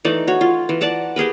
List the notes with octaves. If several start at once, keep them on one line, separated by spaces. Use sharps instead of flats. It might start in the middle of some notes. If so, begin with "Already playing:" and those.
E3 A3 D#4 D5
F#4 C#5
F4
E3
D5 F#5 A5 A#5
G4 G#4 A#4 B4